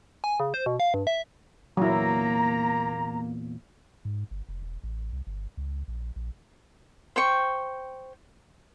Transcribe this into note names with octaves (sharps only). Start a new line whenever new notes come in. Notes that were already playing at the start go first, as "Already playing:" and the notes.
G#5
C#3
C5
B2
F5
G2
E5
E2 A#2 F#3 A#3 E4 A#5
G#2
G1
F1
E1
A1
C2
G1
C#2
A#1
A#1
C5 G5 C#6